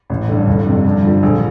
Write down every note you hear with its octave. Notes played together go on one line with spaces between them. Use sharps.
A1
G2 D3
G1
F2 C3 G3
G2
D3 F3
A#1